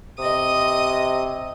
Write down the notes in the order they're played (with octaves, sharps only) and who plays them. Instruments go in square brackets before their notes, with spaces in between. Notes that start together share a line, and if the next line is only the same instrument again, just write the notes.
[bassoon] C3 [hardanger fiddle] D#5 D#6